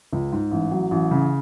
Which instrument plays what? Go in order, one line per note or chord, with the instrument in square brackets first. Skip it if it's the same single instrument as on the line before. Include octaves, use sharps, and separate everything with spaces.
[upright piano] C#2
G#2
A1
F#3
A1
C#3